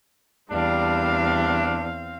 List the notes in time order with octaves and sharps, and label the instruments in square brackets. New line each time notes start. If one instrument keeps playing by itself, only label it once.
[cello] E2 [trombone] G3 [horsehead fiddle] C4 F5 [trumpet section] D4